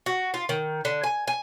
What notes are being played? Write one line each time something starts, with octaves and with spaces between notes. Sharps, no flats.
F#4
F4
D#3
D3
G#5
G#5